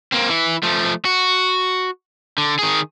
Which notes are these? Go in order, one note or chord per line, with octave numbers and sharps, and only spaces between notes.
A#3 C4
E3 E4
F3 A3
F#4
D3
D#3 G#4